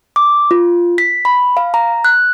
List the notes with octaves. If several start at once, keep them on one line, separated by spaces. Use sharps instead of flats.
D6
F4
B6
B5
F5
A#5
F#6